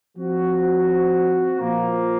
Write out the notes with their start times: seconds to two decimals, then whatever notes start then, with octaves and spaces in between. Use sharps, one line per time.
0.17 F3 C4 F#4
1.58 A#2 F3 A#3